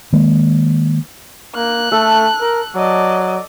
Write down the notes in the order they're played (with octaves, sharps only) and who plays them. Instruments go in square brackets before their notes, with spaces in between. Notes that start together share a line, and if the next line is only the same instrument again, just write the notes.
[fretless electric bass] D#3 G#3 A#3
[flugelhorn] A#3 [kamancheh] F#6
[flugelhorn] A3 [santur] A4
[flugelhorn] A#4
[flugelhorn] F#3 [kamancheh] D5 D#5